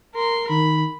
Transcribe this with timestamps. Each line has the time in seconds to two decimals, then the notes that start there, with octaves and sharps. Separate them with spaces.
0.15 A#4 C6
0.50 D#3 B5